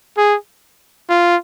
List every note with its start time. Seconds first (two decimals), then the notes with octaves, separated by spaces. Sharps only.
0.17 G#4
1.09 F4